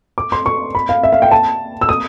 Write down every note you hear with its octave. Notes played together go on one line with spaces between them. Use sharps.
D6
C6
C#6
B5
F5
E5
F5
G5
A5
E6
D#6